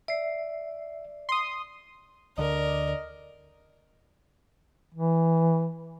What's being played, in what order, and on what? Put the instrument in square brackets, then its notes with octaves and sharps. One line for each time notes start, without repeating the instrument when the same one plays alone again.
[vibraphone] D5 [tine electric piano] E5 C7
[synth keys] C6 D#6
[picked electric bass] D2 D3 [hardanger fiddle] A#4 [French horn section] D5 [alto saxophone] D#5
[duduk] E3